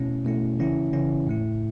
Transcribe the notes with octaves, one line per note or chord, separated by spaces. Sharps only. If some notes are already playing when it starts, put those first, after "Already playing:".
Already playing: B2 A3 C#4 E4
B2 A3 C#4 E4
C#3 E3 C#4 E4
C#3 E3 C#4 E4
A2 A3 E4